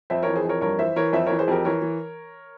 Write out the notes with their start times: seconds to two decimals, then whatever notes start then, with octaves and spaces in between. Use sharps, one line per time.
0.10 F2 C5 E5
0.23 E3 A#4 C#5
0.35 G#4 C5
0.45 F2 A#4 C#5
0.61 G2 A#4 C#5
0.79 E3 C5 E5
0.96 E3 A#4 C#5
1.13 F2 C5 E5
1.26 E3 A#4 C#5
1.39 G#4 C5
1.48 F2 G4 A#4
1.65 E3 A#4 C#5
1.82 E3